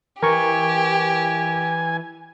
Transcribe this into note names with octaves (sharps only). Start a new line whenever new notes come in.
E3 G4 A#4 G#5 C#6